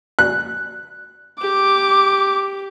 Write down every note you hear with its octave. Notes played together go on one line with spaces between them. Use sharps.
F#6
G4 D6